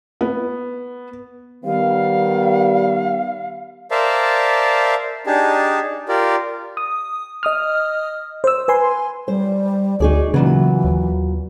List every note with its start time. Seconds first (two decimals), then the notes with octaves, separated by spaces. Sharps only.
0.21 B3
1.64 D#3 G3 B3 F5
3.91 A#4 C5 D5 E5 F5 A5
5.27 D4 D#4 G4 G#4 A5
6.09 F4 G4 A#4 D5
6.77 D#6
7.43 D#5 D#6 F6
8.44 C5 E6
8.68 B4 G#5 C6
9.28 G3 C5
10.00 D2 D#4 F#4 G#4 D5
10.34 A#2 C#3 E3 F#3 B3
10.85 D#2